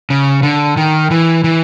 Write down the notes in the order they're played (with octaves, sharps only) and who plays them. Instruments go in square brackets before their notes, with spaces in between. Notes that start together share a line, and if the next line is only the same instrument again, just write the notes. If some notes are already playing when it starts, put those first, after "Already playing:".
[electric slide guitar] C#3
D3
D#3
E3
E3